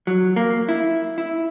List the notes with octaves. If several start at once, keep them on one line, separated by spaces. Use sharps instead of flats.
F#3
A#3
E4
E4